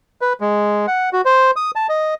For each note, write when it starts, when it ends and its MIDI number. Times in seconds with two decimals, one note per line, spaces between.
0.21 0.33 71
0.41 0.86 56
0.87 1.09 78
1.13 1.21 66
1.25 1.51 72
1.56 1.71 87
1.76 1.87 81
1.89 2.14 75